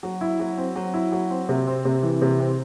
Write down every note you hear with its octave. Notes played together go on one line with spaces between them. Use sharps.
F#3
E4
F#3
C4
F#3
E4
F#3
C4
C3
C4
C3
E3
C3
C4